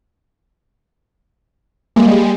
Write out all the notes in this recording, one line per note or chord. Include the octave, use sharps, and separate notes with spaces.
G3 G#3 A#3